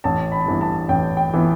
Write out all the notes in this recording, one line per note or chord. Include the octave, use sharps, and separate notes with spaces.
A1 A5
B5
G2 E3 B3
A5
A1 G5
G5
E3 B3